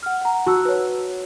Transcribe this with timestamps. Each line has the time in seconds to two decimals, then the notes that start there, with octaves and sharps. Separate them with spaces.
0.03 F#5 F6
0.21 F#5 A#5
0.46 F#4 A5 E6
0.65 B4 C#5